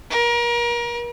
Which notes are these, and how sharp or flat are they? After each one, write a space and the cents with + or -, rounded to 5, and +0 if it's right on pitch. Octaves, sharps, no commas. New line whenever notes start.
A#4 +30